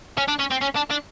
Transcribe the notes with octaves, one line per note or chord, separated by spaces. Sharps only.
C#4
D4
C#4
C4
C#4
D4
D4